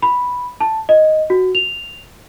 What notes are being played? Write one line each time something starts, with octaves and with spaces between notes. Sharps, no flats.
B5
A5
D#5
F#4
F7